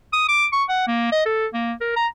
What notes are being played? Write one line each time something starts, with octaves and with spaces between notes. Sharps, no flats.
D#6
D6
C#6
F#5
A#3
D#5
A4
A#3
A#4
A#5